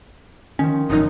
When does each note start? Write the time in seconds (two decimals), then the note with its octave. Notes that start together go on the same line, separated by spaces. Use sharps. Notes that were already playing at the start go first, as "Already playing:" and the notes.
0.59 D#3 F3 C#4
0.90 F1 F#2 D#4